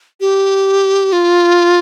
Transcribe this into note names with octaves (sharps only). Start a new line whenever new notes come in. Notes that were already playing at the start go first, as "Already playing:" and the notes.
G4
F4